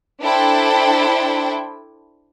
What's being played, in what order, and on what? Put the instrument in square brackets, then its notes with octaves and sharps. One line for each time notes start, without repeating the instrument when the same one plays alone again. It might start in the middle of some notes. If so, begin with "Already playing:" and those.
[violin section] D4 E4 A4 C5 G5